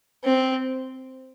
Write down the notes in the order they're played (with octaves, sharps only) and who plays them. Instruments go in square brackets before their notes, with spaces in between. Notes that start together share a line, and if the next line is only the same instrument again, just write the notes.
[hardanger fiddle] C4